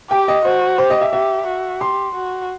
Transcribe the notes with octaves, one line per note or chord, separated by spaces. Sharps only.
G4 G5
D#5
F#4 C5
G4 C5
D#5
E5
G4 E5
F#4
G4 C6
F#4